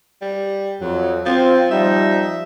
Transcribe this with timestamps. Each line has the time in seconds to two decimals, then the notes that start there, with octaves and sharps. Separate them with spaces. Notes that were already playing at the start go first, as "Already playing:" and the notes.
0.22 G3
0.81 F2 F#3
1.26 F3 C4 F5
1.71 F3 G3 D#4 E5